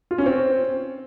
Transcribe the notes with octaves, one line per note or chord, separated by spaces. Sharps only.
F4
C#4
C4